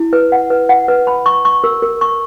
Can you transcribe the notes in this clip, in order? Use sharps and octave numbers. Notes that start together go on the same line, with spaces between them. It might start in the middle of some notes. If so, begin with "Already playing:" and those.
Already playing: E4
B4
F#5
B4
F#5
B4
B5
C#6
C#6
A#4
A#4
C#6